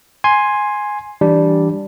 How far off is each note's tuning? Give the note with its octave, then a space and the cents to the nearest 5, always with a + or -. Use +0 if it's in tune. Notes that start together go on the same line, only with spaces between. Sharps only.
G#5 +0 C6 +10
E3 +0 G3 -5 D4 +0